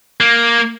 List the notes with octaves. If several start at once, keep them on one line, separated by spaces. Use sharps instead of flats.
A#3